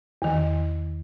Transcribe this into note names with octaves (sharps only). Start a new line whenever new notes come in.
E2 D#3